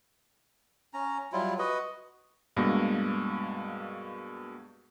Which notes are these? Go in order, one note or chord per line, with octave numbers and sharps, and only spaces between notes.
C#4 A#5
F#3 G3 E4 F4
F#4 B4 D#5
G2 B2 G#3 A#3 A#6